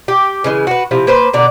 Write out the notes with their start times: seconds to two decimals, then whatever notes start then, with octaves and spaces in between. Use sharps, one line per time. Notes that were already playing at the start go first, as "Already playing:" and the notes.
0.08 G4
0.44 C#3 E3 G#3
0.67 F#4 B4
0.91 C3 F3 E4
1.07 A#3 B4 C5
1.34 B2 D3 D5 A#5